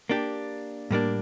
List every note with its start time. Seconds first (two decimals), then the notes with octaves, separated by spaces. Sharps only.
0.09 A#3 D4 G4
0.91 A2 G3 A#3 D4